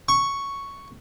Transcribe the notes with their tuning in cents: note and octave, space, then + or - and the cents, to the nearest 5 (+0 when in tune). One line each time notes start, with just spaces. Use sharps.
C#6 +0